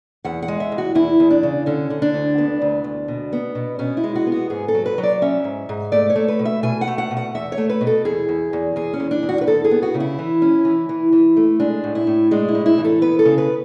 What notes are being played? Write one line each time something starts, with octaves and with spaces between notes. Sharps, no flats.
E2 F#5
F#5
G#3
E5
E2
F#4
E2 E4
E2
D4
C#3
D3 C#4
D3
D4
D2
B3
D2
D2
B2
B3
B2
B2 C#4
E4
G#3
F#4
B3
F#4
G#2 G#4
A4
F#3
B4
F#3
D5
C#4 E5
G#2
G#2
A3 D5
C#5
A3
B4
B2
E5
B2 G#5
F#5
A3
F#5
B2
F#5
E2 E5
C#5
A3
B4
B2
A4
E2 G#4
E2
E2
E2 G#4
C#4
E2
D4
E2
F#4
B4
E2 A4
G#4
B3
F#4
C#3
E4
E3
C#4
E3
E3
E3
A3
G#3 D4
A2
E4
A2
G#3 D4
E4
A2
E4
E3
A4
B3 B4
A4
C#3
B4